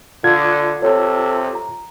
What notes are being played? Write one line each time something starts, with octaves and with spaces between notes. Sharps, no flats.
D3 F4 G#6
C3 A4 C#5
A#5